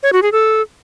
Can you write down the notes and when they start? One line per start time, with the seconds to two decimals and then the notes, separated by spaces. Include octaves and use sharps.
0.03 C#5
0.13 F#4
0.22 G#4
0.32 A4